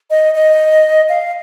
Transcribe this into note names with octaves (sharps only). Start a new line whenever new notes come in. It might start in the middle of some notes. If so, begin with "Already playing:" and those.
D#5
D#5
F5